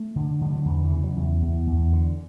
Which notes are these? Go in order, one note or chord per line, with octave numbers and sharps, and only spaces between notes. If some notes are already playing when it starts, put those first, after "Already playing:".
Already playing: A3
D3
D3 G3
F#3
E2 E3
E3
C#3
F#3
E2
E2
E2
D3